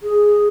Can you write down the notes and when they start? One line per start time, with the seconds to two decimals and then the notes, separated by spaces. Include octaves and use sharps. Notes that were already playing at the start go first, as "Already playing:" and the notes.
0.03 G#4